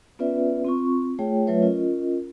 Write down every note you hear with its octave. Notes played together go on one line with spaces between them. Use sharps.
B3 C#4 F4 B4 D5 E5
C4 F4 C#6
A3 F4 G#4 C#5 G5
F#3 A3 F4 B4 C#5 E5
C#4 F4 A#4 D#5